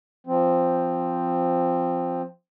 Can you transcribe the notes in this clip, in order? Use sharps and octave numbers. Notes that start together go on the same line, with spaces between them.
F3 C4